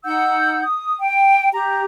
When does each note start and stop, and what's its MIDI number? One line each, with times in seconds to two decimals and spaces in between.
0.04 0.62 63
0.04 0.62 78
0.04 0.62 88
0.04 0.62 91
0.63 0.99 87
1.01 1.49 79
1.53 1.85 67
1.53 1.85 82